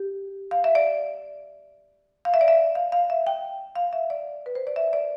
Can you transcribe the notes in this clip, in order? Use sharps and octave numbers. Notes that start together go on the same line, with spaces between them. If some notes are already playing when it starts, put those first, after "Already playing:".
Already playing: G4
F5
E5
D5
F5
E5
D5
E5
F5
F5
E5
G5
F5
E5
D5
B4
C5
D5
E5
D5